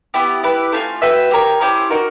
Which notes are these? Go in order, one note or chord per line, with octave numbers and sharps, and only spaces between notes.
B3 E4 G4
E4 G4 B4
A3 C#4 F4
F#4 B4 E5 G5
G4 A#4 C#5
C#4 E4 G4 C5
D#4 F#4 A#4